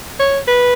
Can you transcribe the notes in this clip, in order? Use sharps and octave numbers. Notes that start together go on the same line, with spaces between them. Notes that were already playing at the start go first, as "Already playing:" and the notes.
C#5
B4